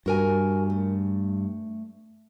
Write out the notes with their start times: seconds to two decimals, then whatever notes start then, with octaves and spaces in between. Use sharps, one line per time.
0.06 G2 F#4 A#4 G#5
0.70 A3